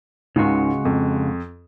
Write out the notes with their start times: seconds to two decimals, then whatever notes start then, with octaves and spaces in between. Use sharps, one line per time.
0.36 C#2 G#2 C#3 G#3 F#4
0.85 F2